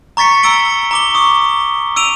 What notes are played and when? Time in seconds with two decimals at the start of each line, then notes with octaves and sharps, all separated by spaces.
0.17 A#5 C#6 A6 B6 C#7
0.43 A#5 E6 A6 D7 G7
0.91 A#5 D6 G7
1.15 C#6 D#6
1.96 E6 D7 D#7 F7